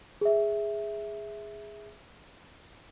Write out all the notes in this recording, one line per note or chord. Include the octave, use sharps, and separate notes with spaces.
G#4 E5